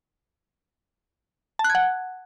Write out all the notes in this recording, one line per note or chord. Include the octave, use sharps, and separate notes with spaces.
A5
F#6
G#6
F#5